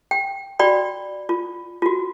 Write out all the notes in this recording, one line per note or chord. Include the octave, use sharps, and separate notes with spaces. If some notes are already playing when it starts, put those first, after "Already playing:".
G5
F#4 D5 G5 B5
F4
F4 F#4